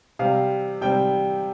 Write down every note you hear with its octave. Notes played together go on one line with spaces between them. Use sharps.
C3 G3 C4 F5
C3 G3 C4 G5